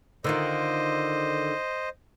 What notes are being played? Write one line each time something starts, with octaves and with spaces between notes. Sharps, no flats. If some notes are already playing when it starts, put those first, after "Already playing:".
D3 D#3 F4 C5 D#5